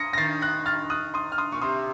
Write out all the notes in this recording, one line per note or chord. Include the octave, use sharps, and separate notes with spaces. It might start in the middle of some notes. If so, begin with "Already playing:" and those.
Already playing: C6 D#6 A#6 C#7
A#6
D#3 A6 C7
F#6 A#6
F6 A6
D#6 F#6
C6 D#6
F6
C6 D#6
A#2 C#6
C3 C6 D#6